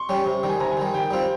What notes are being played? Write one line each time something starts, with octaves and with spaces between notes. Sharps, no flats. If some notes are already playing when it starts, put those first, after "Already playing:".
Already playing: C6 C#6
G3 C#4 G4
C3
D#3 G3
G#5
C3 A#5
G#5
D#3 G3
D#3 G5
G3 C4 F4